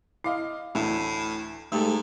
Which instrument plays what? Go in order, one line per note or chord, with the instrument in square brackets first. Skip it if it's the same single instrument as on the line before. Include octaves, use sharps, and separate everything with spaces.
[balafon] E4 [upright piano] D#5 F5 D6
[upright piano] D2 E3 [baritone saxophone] A2
[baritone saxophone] G#2 [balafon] A3 [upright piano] G4 A4